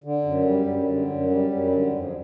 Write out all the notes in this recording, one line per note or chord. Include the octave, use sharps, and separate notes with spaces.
D3
F#2
G3
F#2
D3
F#2
G3
F#2
D3
F2